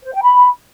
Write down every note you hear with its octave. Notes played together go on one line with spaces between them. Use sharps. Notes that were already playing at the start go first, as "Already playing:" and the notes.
C5
G5
B5